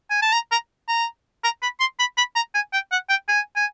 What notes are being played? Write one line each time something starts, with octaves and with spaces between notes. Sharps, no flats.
G#5
A5
A#5
A#5
A#5
A#5
B5
C6
B5
B5
A#5
G#5
G5
F#5
G5
G#5
G#5